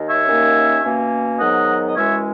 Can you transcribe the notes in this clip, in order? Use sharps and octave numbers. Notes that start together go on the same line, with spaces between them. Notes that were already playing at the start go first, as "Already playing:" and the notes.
Already playing: D#2 D#3
C#5 E5
D#2 D#3 A#3 C#4
B2 A#3 C#4
G#2 D#3 F#3 B3 D#5 F#5
D#5
F#2 E3 G#3 C#4 C#5 E5